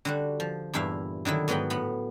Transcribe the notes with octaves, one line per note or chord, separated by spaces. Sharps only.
D3 G3 F#4
F3
E2 G2 A#2 E4 E5 F5
D3 D#3 F#3 E4
G#2 F#3 B3 B4 G5 B5
A2 B3 B5